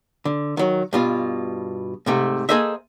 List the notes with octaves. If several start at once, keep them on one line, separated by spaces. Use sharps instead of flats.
D3
D#3 F#3
G2 B2 F4
G#2 C3 A3
A#3 G#4 A4 C5 D#5 E5